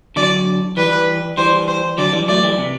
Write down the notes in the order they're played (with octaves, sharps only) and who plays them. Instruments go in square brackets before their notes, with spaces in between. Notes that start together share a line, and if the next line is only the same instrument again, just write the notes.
[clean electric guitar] D3 F#3 [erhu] D5
[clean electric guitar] E3 G3 [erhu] B4
[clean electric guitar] E3 G3 [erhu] C5
[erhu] C5
[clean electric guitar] D3 F#3 [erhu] D5
[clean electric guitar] E3 G3
[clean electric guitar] F#3 A3 [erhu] D5
[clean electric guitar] E3 G3
C3